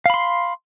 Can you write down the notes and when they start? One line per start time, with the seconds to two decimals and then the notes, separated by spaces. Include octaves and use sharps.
0.06 F5
0.10 B5
0.14 C6